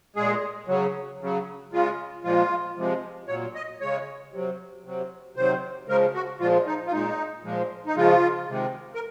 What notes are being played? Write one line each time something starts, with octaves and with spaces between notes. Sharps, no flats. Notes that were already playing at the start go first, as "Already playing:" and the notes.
A#2 G#3 G#4
C#3 F#3
C#3 F#3
C#3 G#3 F4
A#2 F3 G#3 F4
C3 F3 G#3
A#2 F#3 C#5
D#5
C#3 G#3 C#5
C3 F#3
C3 F#3
C3 D#3 F#3 C5
C#3 F3 G#3 A#4
F#4
A#2 F3 G#3 F4
D#4
F4
A#2 G#3 D#4
A#2 F3 G#3
D#4
C#3 F3 G#3 F4
C3 D#3 G#3
A#4